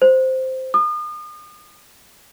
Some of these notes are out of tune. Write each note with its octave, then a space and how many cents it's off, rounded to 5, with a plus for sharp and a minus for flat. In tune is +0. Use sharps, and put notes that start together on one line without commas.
C5 -5
D#6 -40